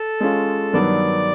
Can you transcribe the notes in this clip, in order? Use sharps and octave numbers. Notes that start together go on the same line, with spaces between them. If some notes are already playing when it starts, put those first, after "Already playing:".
Already playing: A4
G#3 C#4 F4
G2 D#3 F#3 B3 D5